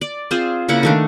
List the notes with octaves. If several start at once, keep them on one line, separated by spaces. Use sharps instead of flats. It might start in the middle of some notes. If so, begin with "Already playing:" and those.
D5
C4 F4 G#4 C5
C#3 A#3 E4 F#5
D#3 A3 D4